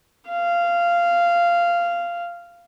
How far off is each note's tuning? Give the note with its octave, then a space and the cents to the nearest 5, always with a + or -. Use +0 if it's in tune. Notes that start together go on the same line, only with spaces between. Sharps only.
F5 -15